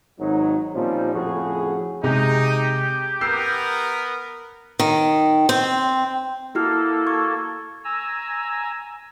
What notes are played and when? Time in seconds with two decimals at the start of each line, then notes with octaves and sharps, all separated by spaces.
0.19 G#1 F#3 D#4
0.73 A#2 F3 G3 C4 C#4 D#4
1.14 F2 A2 C#3 F#4 G#4
2.04 C3 G#3 D#4 G4
3.21 B3 A#4 E6 C7
4.79 D#3
5.49 C4
6.55 A#3 E4 F#4 A4 F6
7.07 C#6 G#6
7.85 G#5 A#5 E6